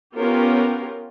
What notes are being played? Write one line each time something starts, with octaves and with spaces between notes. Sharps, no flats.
B3 C#4 F4 G4 A#4